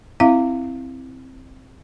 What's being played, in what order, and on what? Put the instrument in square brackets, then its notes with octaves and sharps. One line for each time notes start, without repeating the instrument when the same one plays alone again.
[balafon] C4 E4 E5 F5